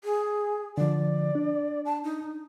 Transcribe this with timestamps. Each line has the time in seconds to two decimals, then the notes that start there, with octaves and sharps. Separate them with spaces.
0.04 G#4
0.78 D3 F3 D5
1.35 D4
1.85 A5
2.04 D#4